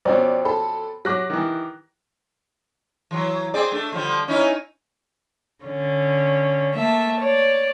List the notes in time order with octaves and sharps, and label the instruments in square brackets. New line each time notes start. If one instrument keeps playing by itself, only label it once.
[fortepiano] F2 B2 C#4 [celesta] C5 G5 [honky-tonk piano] D5
[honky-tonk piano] A4 [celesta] B5
[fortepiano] F#3 [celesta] G4 [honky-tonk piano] D6 F#6 A#6
[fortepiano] D#3 E3
[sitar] E3 F#3
C4 G#4 D5
A3 D4
D3 F3 G3
C#4 D#4 E4
[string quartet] D3 C#4
A3 A#3 E5 A5
C#5 D5